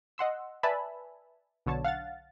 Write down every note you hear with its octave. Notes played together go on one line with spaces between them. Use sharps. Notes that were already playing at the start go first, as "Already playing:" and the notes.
D#5 F#5 C6 E6
B4 D5 E5 G#5 A5 B5
B1 D3 C#5 A5
F5 F#5 F6 A6